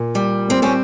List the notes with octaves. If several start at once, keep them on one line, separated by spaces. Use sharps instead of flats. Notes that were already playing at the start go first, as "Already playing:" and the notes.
Already playing: A#2
G3
C4
C4 C#4